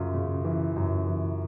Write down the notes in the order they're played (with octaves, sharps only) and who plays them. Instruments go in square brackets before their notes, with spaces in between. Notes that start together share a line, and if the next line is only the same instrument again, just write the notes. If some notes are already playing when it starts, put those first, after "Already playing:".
Already playing: [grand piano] F#2 C#3 F4
C#3
E3
F#2
E3